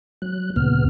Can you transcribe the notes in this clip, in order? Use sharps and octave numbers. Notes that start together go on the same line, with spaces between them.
F#3 F#6
D2 A#2 C#3 B3 F6